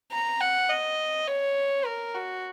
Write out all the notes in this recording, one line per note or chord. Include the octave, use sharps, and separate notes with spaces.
A#5
F#5
D#5
C#5
A#4
F#4